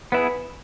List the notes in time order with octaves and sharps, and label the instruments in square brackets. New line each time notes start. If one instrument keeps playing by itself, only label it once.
[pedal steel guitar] B3 E4 G#4 [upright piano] B4